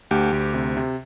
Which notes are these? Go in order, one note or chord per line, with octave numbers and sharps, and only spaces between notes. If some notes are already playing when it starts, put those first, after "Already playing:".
D2 G4
D2
C3
C3